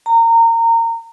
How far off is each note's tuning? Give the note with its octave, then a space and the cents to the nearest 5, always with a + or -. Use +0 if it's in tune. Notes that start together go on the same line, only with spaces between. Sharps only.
A#5 -25